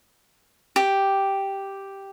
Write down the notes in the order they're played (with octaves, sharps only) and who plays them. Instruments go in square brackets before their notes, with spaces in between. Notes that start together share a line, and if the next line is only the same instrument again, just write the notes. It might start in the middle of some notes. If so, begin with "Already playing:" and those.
[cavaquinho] G4